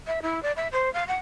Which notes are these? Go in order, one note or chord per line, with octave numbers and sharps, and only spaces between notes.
E5
E4
D5
E5
C5
F5
F#5